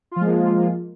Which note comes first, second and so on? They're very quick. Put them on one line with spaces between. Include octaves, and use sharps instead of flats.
F4 F3 G#3 A#3